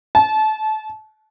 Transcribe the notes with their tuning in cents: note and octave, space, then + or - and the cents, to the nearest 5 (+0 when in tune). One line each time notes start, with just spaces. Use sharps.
A5 -25